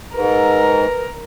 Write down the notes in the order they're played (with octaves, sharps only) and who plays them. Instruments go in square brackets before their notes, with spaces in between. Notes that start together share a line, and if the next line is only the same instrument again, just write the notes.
[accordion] G#2 [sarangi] A#4 [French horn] B4